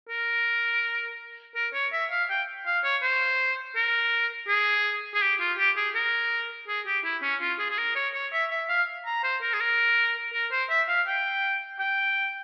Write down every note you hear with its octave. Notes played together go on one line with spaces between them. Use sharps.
A#4
A#4
C#5
E5
F5
G5
F5
C#5
C5
A#4
G#4
G#4
G4
F4
G4
G#4
A#4
G#4
G4
E4
C#4
F4
G#4
G#4
A#4
C#5
C#5
E5
E5
F5
A#5
C5
A#4
G#4
A#4
A#4
C5
E5
F5
G5
G5